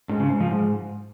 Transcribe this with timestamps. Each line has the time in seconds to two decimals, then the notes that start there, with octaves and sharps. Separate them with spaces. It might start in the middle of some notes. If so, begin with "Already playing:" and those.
0.09 G#2
0.20 C#3
0.30 G#2
0.40 F3
0.51 G#2